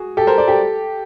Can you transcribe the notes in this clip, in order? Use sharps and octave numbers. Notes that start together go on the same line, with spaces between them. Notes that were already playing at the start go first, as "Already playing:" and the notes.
Already playing: F#4 G#4
G4 A4
A#4 C5
C5 D5
G4 A4